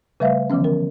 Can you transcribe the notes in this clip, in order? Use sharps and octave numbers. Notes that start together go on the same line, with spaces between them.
C#3 G3 A3 B4 E5 F5
D3 E3 F3 B3 C#4
A#4